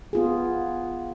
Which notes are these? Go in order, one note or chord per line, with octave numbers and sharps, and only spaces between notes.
B3 F4 G#4